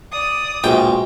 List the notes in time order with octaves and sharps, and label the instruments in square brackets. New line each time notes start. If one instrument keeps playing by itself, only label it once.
[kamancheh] D5 D#6
[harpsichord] A#1 G5 [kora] B2 G#3 C5